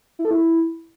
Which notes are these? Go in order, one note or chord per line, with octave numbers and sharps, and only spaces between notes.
E4
A4
E4